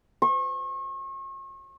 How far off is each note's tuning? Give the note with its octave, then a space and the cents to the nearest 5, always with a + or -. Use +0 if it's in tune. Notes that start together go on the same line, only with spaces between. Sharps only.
C#6 -40